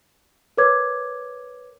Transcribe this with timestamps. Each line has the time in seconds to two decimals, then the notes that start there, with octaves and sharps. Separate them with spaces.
0.57 A#4 B4 C#5 D6 G#6